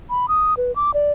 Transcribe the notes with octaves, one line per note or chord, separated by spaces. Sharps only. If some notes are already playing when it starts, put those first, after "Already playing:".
B5
D#6
B4
D6
D5